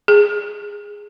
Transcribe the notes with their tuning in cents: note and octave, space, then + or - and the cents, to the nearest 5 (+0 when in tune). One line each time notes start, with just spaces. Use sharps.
G#4 -5